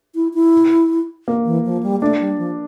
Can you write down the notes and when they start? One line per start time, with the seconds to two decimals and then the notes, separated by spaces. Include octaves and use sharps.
0.15 E4
0.34 E4
1.28 A#3
1.46 E3
1.65 F3
1.83 G3
2.01 A3 D4
2.20 G3
2.38 F3